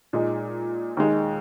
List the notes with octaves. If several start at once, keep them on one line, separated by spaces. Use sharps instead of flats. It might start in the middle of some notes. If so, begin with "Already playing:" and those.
A#2 G#3 D#4
D#2 D#3 G#3 D#4